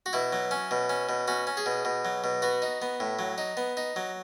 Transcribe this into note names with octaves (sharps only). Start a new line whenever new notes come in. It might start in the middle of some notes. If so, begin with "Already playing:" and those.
F#4
B2 E4
F#3
C#4
B2
C#4
B2
C#4 F#4
C#4
G#4
B2
B2
F#3
B2
B3 F#4
D#4
B3
A2
F#3
D#4
B3
D#4
F#3